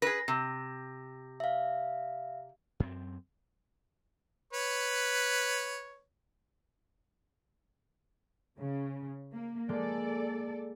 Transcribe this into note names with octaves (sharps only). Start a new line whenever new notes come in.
G#4 B4 A#6
C3
E5 F5
F#2 C4
B4 C#5
C#3
A#3
G#3 A#3 A4 D5